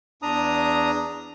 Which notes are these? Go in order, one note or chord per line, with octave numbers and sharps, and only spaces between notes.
E2 D4 A#5 D#6